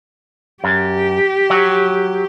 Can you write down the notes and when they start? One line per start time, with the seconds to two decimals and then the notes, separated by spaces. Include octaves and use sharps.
0.64 F#2 G4
1.50 F#3